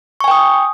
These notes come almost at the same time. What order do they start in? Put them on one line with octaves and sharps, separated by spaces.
C#6 G#5 G5 D#6